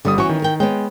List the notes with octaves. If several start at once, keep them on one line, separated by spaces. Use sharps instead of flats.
G1 D3 G3 D#6
E3 B3 C#4 F#4 C#6
D#3
A#4 G5
G#3 B3 C#5 G5